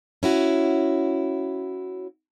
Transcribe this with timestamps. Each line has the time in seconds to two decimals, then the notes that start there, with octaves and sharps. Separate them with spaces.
0.23 C#4 E4 F#4